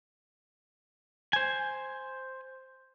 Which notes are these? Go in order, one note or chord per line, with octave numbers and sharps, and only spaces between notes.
C5 G#5